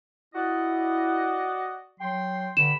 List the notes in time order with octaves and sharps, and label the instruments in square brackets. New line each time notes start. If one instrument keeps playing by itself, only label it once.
[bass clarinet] E4 [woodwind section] F#4 D5 D#5
[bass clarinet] F#3 [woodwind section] G5 C6
[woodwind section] G2 B5 [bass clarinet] D3 [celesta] E7